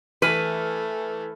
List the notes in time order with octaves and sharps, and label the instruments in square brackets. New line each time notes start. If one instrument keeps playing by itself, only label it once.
[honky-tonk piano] E3 F6 [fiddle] A3 [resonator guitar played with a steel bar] B4